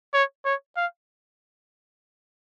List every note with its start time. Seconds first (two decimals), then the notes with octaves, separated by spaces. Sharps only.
0.14 C#5
0.45 C#5
0.77 F5